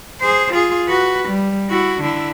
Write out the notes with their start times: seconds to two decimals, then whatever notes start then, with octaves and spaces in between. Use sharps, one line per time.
0.20 G#4 C5
0.54 F4 G#4
0.88 F#4 B4
1.29 G3
1.70 E4 F#4
2.01 D3 E4